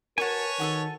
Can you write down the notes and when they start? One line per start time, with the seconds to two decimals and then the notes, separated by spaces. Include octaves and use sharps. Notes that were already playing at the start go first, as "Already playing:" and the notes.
0.18 E4 F#4 A#4 B4 C#5 G#5 A5
0.60 D#3 F#4 G#4 A4